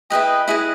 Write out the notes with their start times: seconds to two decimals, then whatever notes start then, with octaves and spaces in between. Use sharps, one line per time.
0.10 E4 G#4 B4 D#5 G5
0.48 E4 G#4 B4 D#5